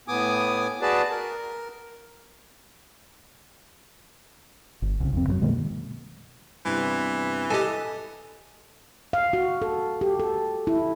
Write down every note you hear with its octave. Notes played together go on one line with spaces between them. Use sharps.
A2 B3 G#5 D6 D#6
F#4 G#4 B4 D5 A5
A#4
G1
C2 C#3
F2 C4
F#2 F3 F#3
B2 D#3 G#3 A#3
G2 C3 E3 B3
G4 A4 D#5 G#5
F5
F#4
A4
G4
A4
E4